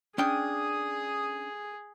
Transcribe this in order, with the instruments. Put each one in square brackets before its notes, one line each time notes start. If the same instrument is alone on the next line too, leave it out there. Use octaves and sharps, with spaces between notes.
[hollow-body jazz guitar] C#4 D4 G5 [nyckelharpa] G#4 [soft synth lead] D#6